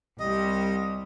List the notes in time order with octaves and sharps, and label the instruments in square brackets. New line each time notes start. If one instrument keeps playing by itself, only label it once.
[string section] C2 G3 [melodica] D#5